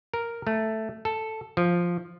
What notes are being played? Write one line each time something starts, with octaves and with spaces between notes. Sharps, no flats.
A#4
A3
A4
F3